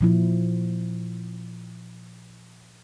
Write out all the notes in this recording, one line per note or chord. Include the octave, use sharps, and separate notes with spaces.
A#2 F3 E4